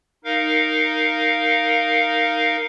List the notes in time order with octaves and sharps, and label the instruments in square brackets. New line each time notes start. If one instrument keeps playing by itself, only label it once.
[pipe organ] D#4 A#4 F5